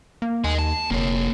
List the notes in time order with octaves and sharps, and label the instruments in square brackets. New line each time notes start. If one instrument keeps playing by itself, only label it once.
[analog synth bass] A#3
[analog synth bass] D#2 [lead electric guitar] D#5 G#5
[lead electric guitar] A5
[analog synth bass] F1 [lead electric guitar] A#3 C#5